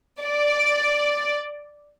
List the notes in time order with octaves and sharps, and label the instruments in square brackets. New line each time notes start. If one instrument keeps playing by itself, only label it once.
[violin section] D5